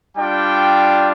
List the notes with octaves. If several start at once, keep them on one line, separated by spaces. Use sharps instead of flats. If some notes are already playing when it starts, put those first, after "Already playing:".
G3 D4 F4 G5